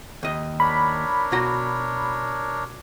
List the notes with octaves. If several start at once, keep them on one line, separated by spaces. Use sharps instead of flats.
D#2 D#5
D4 A#4 C#5 B5
B2 F#4 A#5